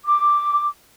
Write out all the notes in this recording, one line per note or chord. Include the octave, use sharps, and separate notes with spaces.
D6